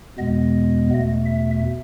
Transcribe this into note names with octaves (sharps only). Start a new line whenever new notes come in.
E2 B2 G#3 B3 D#5
E2 B2 A3
E5